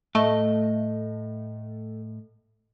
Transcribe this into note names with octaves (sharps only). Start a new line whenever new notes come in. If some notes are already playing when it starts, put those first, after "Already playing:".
A2 A3 D#5